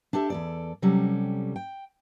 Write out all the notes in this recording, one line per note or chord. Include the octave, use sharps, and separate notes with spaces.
D4 G4 A4 D#5 E5
E2 A4 D5
C3 F#3 G3 C#4 A4
G5